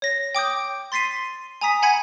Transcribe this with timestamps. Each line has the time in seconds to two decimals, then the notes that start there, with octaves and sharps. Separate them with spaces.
0.02 C#5 A#6
0.35 G5 D6 D#6 G6
0.92 C6 A6 B6 C7 D#7
1.61 G#5 A#5 D#6 B6
1.82 F#5 G#5 B5 G#6 C#7